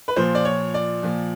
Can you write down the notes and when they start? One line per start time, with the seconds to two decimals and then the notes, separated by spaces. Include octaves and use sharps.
0.08 B4
0.16 A#2 F3 C5
0.35 D5
0.45 C#5
0.74 D5
1.03 A#2 F3